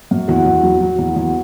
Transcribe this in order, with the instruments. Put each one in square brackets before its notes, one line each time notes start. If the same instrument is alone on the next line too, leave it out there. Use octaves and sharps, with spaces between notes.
[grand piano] F#2
E2 F#4
E2
F#3
F#3
E2
E2